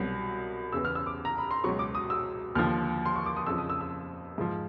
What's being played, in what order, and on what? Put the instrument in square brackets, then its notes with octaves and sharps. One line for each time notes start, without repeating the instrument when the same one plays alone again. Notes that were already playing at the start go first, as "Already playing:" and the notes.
Already playing: [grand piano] C2 B2 F#3
E2 C#3 E3 E6
F6
E6
D6
A#5
B5
C6
C#2 B2 F#3 C#6
D6
D#6
E6
D#2 D3 F3 F6
C6
C#6
D6
D#6
F2 C#3 F3 E6
D#6
E6
E6
G#2 F3